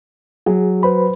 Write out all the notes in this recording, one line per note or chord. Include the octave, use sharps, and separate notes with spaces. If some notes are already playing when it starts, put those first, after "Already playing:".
F#3 G#4
B4 C5 B5